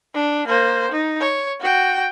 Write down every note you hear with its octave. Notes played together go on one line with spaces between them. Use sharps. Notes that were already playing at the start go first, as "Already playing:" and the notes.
D4
A#3 C5
D#4
C#5
F#4 G5